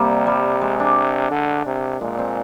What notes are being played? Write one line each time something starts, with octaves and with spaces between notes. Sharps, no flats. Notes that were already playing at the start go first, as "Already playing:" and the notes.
Already playing: C3 G3 A#3
G3
G#3
D4
D3
C3
A#2 G#3
C4